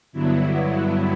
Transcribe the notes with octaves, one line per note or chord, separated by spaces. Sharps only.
G2 D3 F#3 B3 E4